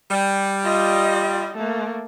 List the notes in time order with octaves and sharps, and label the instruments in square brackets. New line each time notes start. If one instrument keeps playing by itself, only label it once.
[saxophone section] G3
[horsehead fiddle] F4 D#5
A3 A#3